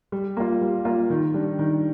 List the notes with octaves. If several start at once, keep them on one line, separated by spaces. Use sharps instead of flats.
G3
A#3 F4
G3
A#3 F4
D#3
G3 D4
D#3